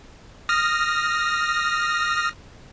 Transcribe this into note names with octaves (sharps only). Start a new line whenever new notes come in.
D#6 F6 A#6